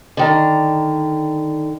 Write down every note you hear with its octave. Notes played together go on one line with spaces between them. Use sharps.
D3 D#3 A#5